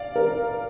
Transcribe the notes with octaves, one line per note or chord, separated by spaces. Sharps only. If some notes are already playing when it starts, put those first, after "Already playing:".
Already playing: D5 F5
A#4